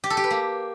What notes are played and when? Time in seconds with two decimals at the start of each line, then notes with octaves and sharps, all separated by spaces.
0.04 G4
0.10 A4
0.17 G4
0.24 B4
0.30 A#3